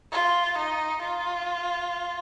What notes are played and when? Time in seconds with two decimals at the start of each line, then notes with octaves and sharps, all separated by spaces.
0.12 F4
0.57 D#4
1.03 F4